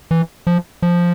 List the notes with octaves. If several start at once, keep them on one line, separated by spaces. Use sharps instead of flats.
E3
F3
F3